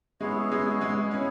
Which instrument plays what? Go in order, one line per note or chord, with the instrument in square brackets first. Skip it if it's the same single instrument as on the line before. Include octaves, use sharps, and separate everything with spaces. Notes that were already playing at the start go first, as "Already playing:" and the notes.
[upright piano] G#3 [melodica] B3 E4 G#4 C#5
[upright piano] G#3
G#3
[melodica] B3 E4 G#4 C#5 [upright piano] C#4